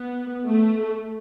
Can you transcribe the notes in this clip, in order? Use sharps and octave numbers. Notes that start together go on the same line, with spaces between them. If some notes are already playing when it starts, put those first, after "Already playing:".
Already playing: B3
A3